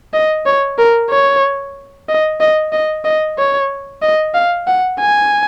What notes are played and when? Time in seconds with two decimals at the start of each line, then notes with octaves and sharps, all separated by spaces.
0.14 D#5
0.46 C#5
0.78 A#4
1.10 C#5
2.08 D#5
2.40 D#5
2.72 D#5
3.04 D#5
3.38 C#5
4.02 D#5
4.34 F5
4.67 F#5
5.00 G#5